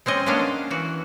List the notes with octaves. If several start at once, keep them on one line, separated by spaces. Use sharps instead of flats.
G#3 C4 C#4 D#5
A#3 B3 C#4 D4 F5
E3 F#4